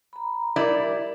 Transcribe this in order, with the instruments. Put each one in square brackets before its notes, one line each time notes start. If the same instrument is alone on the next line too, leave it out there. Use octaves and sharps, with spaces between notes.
[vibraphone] A#5 B5
[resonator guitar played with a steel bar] G3 E4 D5 [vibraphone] A#4 D6